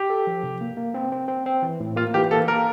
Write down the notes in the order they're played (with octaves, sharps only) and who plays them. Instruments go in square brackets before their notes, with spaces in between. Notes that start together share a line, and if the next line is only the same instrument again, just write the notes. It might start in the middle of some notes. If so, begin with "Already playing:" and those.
Already playing: [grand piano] G4
[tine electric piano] A4
F3
C3
A#3
A#3
C4
C4
C4
C4
E3
A2
[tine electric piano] A#3 [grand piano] F4
[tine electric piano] E3 [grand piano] G4
[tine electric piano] A#3 [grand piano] A4
[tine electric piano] A#3 [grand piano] A#4